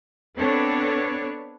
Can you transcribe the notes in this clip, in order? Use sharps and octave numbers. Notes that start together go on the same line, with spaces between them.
B3 C4 D4 A4 B4 C#5